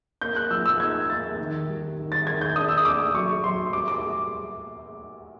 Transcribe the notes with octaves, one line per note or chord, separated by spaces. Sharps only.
A#3 G6
F#6
F3 E6
E6
D#4 G#6
A#3 A6
D#3
G3
D#3
A6
D#3 G#6
G6
D4 D#6
E6
D#6
D4 D6
F#3 C#6
F#3 C6
G3 D6
D6